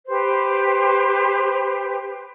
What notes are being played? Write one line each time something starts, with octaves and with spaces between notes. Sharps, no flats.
G4 B4 C5